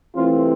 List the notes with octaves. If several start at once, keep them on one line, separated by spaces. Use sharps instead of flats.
C2 C3 E3 A3 C4 F4